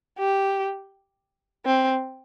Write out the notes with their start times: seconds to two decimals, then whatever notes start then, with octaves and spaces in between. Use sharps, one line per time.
0.19 G4
1.66 C4